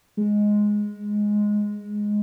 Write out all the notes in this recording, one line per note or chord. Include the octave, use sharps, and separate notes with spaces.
G#3